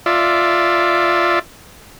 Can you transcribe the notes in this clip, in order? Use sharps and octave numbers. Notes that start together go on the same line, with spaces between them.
F4 D5 E5